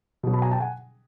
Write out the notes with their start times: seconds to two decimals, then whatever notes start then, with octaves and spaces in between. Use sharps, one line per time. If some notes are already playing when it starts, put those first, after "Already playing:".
0.23 B2 F#3
0.33 A5 B5
0.42 G#5 A#5
0.51 G5 A5
0.60 F#5 G#5